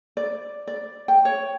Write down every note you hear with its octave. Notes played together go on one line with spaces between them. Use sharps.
D5
D5
G5
C#5